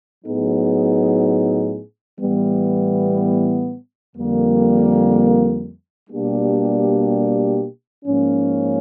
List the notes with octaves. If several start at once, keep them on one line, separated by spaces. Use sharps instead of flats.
A2 F#3 B3 D#4 G#4
A2 E3 G3 B3
F2 D3 G3 A#3
B2 G3 A#3 D4 G4
G#2 F3 A#3 C#4